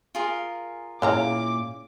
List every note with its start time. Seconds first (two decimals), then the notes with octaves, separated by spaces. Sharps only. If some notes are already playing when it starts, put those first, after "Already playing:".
0.15 F4 G#4 A#4
1.02 A#2 C#3 E4 F5 A#5 D6